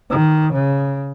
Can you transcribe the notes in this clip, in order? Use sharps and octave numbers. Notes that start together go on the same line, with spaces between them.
D#3
C#3